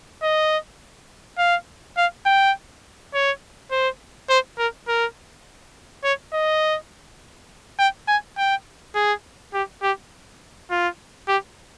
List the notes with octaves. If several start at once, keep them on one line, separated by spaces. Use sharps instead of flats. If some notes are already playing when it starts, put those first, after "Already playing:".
D#5
F5
F5
G5
C#5
C5
C5
A#4
A#4
C#5
D#5
G5
G#5
G5
G#4
G4
G4
F4
G4